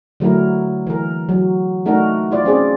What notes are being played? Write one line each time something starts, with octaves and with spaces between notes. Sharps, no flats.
D3 F#3 A3 E4 A#4
E3 A#4
F#3
A3 D4 D#4 F#4 A#4
E4 F4 D5
C4 C#4 G#4 D5